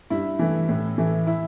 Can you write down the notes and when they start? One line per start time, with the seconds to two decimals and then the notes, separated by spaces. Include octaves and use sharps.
0.10 G2 E4
0.39 E3 A3
0.69 A2
0.98 E3 A3
1.27 E4